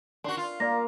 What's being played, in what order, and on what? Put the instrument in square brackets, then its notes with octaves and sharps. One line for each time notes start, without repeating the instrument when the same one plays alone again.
[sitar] D4 F#4 [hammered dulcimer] C6
[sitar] F4
[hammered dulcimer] A#3 [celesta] D5 A#6